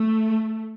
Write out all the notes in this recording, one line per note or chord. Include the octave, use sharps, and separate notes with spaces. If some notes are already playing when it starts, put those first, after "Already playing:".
Already playing: A3